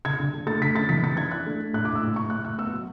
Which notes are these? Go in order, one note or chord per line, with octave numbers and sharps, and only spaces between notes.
D3 G#6
D3
D3
A3 A6
D3 B6
C#4 A6
E3 B6
E3 A6
D4 G#6
D4 F#6
A3
D4
A2 F#6
A2 D6
E6
A2
A2 C#6
A2 F#6
A2 F#6
B3 E6
F#3